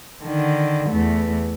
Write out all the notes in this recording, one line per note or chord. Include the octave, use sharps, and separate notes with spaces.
D3 D#3
E2 A3